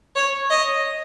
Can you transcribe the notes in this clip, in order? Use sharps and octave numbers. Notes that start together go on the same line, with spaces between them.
C#5
D#5